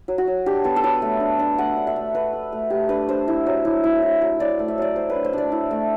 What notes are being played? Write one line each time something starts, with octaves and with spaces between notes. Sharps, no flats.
F#3
F#4
F#3
D4 G4
B3 A4
A4
F#3 B4
A3
D4
D4
A3 F#5
D4
E5
A3
A3 B4
A3
A3
A3 G4
D4 B4
D4 C5
E4
F#3
E4
E4
E4
F#3
F#3 D5
A3
E5
F#3 D5
F#3 C5
B4
D4
C5
D4 D5
E4
A3